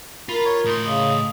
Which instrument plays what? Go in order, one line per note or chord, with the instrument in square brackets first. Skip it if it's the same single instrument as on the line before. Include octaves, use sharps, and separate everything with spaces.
[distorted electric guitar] F4 [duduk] A#4 [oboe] B5
[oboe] C#5
[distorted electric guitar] A2 C6 [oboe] D#4
[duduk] C#3 [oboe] D#5